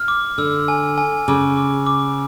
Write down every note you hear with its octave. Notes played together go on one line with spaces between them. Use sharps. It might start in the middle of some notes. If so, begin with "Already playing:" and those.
Already playing: F6
D6
D3 E6
G#5
G#5
C#3 D6
D6
D6